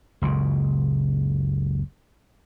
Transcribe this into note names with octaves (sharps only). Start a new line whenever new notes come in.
F#1 C#2 A#2 C#3